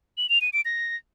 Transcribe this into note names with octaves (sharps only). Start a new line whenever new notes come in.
F#7
F7
D#7
D7
A#6